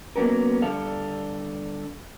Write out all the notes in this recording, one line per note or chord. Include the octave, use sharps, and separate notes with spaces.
F#3 A#3 B3 C#4 A#4
D3 G3 A4 F5